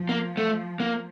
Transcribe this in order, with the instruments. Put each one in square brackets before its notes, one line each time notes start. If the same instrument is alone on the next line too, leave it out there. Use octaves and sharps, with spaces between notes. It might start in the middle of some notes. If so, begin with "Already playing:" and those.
Already playing: [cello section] F3
[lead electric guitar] A#3
A3
A#3